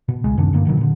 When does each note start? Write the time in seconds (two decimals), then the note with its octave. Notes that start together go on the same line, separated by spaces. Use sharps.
0.08 B2
0.24 C#2 G#3
0.38 F#2 C3 D#3 D4
0.53 G2 D3 A#3
0.65 A#2 D3 D#3 F#3
0.77 A#2 D3